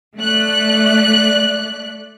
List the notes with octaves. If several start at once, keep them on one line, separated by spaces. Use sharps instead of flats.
A3 D5 F#6